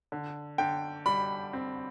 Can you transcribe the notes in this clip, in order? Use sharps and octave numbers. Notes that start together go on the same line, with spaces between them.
D3
D3 G5
G3 B5
C4